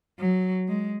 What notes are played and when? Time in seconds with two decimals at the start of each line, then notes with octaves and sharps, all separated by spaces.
0.19 F#3
0.68 G#3